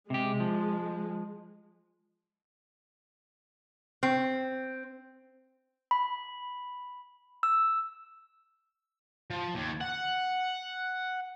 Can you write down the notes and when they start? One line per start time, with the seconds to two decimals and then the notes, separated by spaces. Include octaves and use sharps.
0.10 C3 G#3 G4
0.40 F3
4.03 C4
5.91 B5
7.43 E6
9.30 F3
9.55 D#2
9.81 F#5